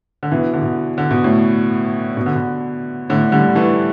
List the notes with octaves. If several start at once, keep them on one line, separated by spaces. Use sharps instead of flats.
D3
B2 E3
D3
B2
D3
B2
A2
B2
D3
B2
A2 D3
D3 G3
E3 A3